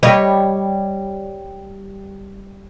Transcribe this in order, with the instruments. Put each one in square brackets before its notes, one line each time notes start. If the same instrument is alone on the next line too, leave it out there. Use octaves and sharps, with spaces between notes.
[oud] G3 C#5 D#5